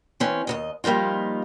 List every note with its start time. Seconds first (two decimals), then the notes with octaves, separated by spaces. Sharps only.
0.20 E3 C4 C#4
0.47 D#2 C#3 D#5
0.84 F3 G3 A#3 D#4 F4